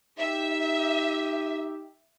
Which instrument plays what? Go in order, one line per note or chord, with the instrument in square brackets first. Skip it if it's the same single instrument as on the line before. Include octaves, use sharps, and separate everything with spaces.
[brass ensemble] D#4 G4 [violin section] E5